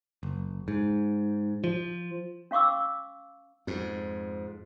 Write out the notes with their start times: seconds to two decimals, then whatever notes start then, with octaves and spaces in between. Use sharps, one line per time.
0.23 F#1
0.68 G#2
1.64 F3
2.51 C#4 F5 C#6 D6 E6
3.67 F2 G#2